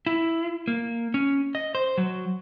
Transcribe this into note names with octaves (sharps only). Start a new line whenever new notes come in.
E4
A#3
C#4
D#5
C5
F#3